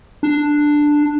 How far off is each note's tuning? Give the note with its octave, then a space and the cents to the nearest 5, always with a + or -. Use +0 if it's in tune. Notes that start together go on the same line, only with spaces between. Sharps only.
D4 +5